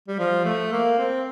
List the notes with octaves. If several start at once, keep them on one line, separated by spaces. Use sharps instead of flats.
G3
F3
A3
A#3
C4